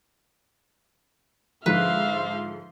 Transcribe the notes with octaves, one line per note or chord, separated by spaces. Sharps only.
G#2 D3 F3 D#4 B4 E5 F5 C6